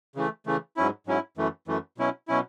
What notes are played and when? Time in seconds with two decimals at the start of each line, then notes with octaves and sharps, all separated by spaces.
0.15 C#3 E3 A3
0.46 C#3 E3 A3
0.77 G#2 F#3 C#4 E4
1.07 G#2 F#3 C#4 E4
1.37 F#2 E3 A3
1.67 F#2 E3 A3
1.98 B2 F#3 C#4 E4
2.28 B2 F#3 C#4 E4